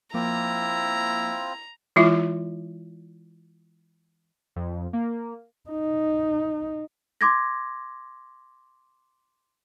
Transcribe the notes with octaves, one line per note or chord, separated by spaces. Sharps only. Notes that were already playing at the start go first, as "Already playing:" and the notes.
F3 A#3 C4 E4 F4 A#5 D6
E3 G#3 E4 F4 E5
F2
A#3
D#4
C6 D6 G#6 A#6